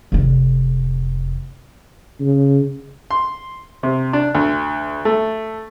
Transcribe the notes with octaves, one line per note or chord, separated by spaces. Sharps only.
F1 D3
C#3
C6
C3
D4
D2
A3